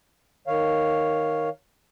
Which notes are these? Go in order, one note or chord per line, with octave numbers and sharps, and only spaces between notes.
D#3 C#5 F5